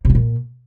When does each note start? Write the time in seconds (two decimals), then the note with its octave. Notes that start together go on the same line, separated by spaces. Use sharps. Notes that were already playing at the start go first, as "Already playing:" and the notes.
0.05 C3
0.10 F3
0.15 A#2